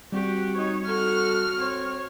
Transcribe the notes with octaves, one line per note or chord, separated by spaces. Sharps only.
G3 C4 F#4 G4
D#4 C#5
F#4 A4 F6
C4 C#5